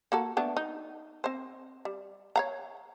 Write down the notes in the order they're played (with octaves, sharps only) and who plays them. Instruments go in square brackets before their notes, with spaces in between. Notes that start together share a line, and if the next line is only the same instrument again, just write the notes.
[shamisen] A#3 F#4 A4
A3 B3 D4
D#4
C4 C5
G3
C#5 F5 A#5